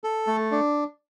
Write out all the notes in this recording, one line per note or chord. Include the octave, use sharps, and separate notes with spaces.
A4
A3
D4